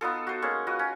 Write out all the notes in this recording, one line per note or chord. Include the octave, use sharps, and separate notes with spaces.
B3 D#4 F4 A4
F#4 C5
G#3 A#3 C#4
F4 F#4 B4 D#5
C#4